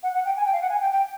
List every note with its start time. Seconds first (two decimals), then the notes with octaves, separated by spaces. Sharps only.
0.03 F#5
0.15 F#5
0.25 G5
0.37 G#5
0.45 G5
0.53 F5
0.62 F#5
0.70 G#5
0.81 G5
0.92 G5